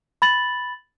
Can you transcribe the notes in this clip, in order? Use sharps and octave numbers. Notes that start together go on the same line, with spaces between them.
B5 A6 F#7